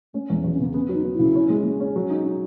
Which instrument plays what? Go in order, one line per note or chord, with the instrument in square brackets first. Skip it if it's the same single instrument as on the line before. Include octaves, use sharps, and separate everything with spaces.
[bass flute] A3 [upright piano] C#4
[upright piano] E2 [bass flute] G#3
[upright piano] E2 [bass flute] F#3
[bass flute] C#4
[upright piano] C#3 [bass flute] B3
[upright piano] B3 [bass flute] C#4
[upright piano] F#3
[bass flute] D#4
[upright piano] B3
[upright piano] C#3 [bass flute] E4
[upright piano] C#4
G#3
G#3
C#4
F#3
D#4
D#4